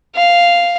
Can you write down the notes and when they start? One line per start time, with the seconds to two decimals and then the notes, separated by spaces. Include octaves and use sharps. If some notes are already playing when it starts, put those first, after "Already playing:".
0.15 F5